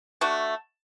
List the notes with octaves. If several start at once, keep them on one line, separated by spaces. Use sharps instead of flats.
A3 D4 F#4